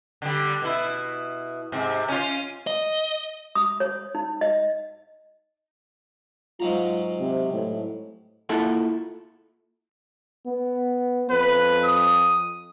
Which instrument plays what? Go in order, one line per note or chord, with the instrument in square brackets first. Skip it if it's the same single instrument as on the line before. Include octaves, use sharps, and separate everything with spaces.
[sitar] D3 G3
B2 E4
G#2 C3
C#4 F4
[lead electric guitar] D#5
[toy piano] D#6
C#5
D#4
D#5
[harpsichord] G#2 F#3 A#5 [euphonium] F4
[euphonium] C3
A2
[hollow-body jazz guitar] A#3 E4 F4 A4 E5 F#5
[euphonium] B3
[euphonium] F2 [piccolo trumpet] B4
[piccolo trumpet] D#6